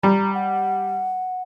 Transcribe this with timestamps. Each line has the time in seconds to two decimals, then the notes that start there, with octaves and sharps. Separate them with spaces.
0.03 G3 A#5
0.34 F#5